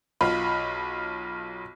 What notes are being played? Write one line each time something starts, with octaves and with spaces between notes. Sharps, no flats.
B1 F4 B5